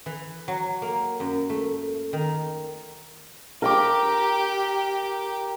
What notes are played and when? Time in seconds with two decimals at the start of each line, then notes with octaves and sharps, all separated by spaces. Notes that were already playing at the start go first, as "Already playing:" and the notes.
0.06 E3
0.48 F#3
0.82 A#3
1.20 F#2
1.50 A3
2.13 D#3
3.62 G4 A#4 G5 D6